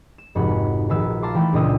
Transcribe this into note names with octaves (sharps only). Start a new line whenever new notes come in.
E7
F1 G#2 F#4 B5
A#1 D#3 B4 E6
F5 A5 A#5 C6 D6
E3 A3 G5 B5
C#2 A#2 D4 D#5 D#6 E6